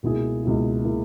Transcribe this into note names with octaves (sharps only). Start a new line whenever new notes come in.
C#2 B2 A#3 E4 G#4
C#2 B2 A#3 E4 G#4
B2 A#3 E4 G#4